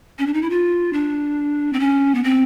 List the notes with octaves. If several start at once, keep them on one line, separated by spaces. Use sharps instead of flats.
C#4
D4
D#4
E4
F4
D4
C4
C#4
B3
C4